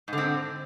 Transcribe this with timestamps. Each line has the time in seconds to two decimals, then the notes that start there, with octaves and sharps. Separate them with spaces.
0.08 G#2
0.13 D3
0.18 C4